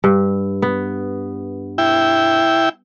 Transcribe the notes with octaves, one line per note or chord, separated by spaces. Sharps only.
G2
B3
E4 G5